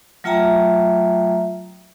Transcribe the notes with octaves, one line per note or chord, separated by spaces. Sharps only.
F#3 A3 F4 E5 G5 A#5